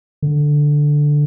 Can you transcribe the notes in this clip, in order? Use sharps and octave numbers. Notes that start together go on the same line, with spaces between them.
D3